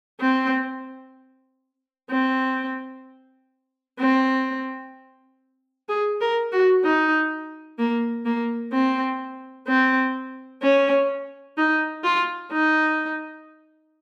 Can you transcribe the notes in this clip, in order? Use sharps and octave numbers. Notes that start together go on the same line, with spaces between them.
C4
C4
C4
G#4
A#4
F#4
D#4
A#3
A#3
C4
C4
C#4
D#4
F4
D#4